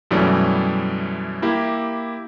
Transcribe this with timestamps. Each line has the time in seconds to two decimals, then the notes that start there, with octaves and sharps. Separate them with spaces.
0.11 F#2 B2 E3 G3 A3 C#4
1.42 A#3 E4 G4